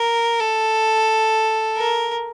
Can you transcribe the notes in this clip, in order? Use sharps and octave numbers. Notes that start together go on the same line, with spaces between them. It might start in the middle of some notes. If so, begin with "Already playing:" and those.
Already playing: A#4
A4
A#4